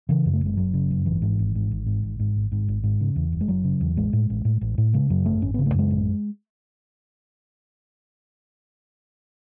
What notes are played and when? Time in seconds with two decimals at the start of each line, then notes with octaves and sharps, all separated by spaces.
0.09 C#3 E3
0.26 F#2
0.33 A3
0.41 F#1 G#3
0.57 F#1 F#3
0.74 C#3
0.91 F#2
1.06 G#1 E3
1.22 G#2
1.39 G#1
1.55 G#2
1.71 G#1
1.86 G#2
2.03 G#1
2.19 G#2
2.36 G#1
2.52 G#2
2.68 G#1
2.84 G#2
3.01 C#3
3.16 E2
3.33 F#1
3.41 G#3
3.48 F#1 F#3
3.64 C#3
3.81 E2
3.96 A1 G#3
4.13 A2
4.30 A1
4.45 A2
4.61 A1
4.78 A2
4.93 C#3 G#3
5.10 F#2 F#3
5.26 G#1 A3
5.42 G#1 C#4
5.54 C#3 B3
5.66 A3
5.74 F#2 G#3
5.91 A1